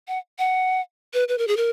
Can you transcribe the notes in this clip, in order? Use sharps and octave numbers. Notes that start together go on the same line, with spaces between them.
F#5
F#5
B4
B4
A#4
G#4
A#4